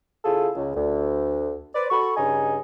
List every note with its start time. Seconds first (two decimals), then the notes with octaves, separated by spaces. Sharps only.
0.24 C#3 E4 F4 G#4 A4
0.56 C#2
0.75 D2
1.74 B4 C5 D5
1.90 F#4 A4 B5 C#6
2.16 G2 C#3 D#4 D#5 G#5